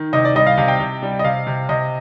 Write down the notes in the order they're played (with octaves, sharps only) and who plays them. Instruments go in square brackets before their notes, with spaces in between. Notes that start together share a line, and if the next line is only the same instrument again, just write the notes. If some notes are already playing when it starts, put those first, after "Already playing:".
Already playing: [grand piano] D#3
C3 D#5
D5
G3 D#5
F5
C3 F5
G5
C3
G3
D#5
C3 F5
C3
C3 D#5